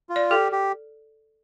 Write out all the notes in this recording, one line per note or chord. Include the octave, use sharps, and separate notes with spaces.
F4
D5
G4 A4
G4